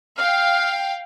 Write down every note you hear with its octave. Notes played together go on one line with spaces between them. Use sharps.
F5 G5 F6